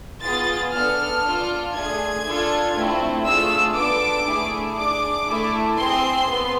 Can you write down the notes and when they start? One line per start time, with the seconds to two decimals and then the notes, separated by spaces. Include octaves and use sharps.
0.22 B3 F4 G#4 A6
0.73 B3 D4 A4 F6
1.24 D4 F4 A4
1.74 A3 D4 G#4 G#6
2.25 D4 F4 A4
2.76 A3 C4 E4
3.25 A3 D4 F4 G#4 E6
3.75 B3 D4 A4 D6
4.26 A3 E4 G#4
4.76 D4 G#4 D6
5.28 A3 E4 A4
5.77 C4 G#4 C6
6.28 B3